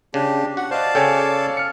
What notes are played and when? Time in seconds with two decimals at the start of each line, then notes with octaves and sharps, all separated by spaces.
0.14 C#3 D4 G4
0.57 F#4 F#5
0.71 C5 D5 D#5 F5 A5
0.95 C#3 A4 C#5 G5 G#5
1.57 F6 C#7